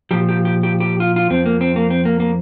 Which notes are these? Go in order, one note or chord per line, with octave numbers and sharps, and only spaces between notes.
A#2 F3 G4
G4
G4
G4
G4
F4
F4
F2 F3 C4
A#3
C4
A#3
C4
A#3
A#3